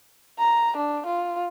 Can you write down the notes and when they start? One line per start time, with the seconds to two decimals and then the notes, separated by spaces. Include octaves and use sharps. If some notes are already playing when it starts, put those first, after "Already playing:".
0.40 A#5
0.77 D4
1.07 F4